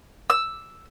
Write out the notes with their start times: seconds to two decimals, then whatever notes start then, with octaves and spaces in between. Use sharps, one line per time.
0.30 E6